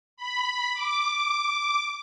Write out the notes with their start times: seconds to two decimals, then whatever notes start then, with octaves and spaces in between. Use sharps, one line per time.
0.17 B5
0.74 D6